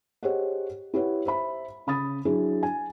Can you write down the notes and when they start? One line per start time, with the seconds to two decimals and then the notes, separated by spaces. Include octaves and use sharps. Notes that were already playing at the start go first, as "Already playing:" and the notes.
0.23 G4 G#4 C5 C#5 D#5 F#5
0.94 E4 G4 B4 C#5 F#5
1.26 C5 E5 B5
1.87 C#3 B5 D#6 A6
2.25 F#3 D4 E4 G#4
2.63 G#5